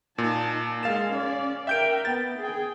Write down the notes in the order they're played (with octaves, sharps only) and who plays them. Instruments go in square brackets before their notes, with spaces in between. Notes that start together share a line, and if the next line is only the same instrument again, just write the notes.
[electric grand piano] A#2 [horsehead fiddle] D#4 A5
[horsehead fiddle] G#3 A#4 [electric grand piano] F5 A6 E7
[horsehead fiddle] C#4 D5
[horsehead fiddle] A#4 G5 [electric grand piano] E5 G6 D7
[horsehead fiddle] B3 [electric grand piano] A6
[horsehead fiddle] G#4 G5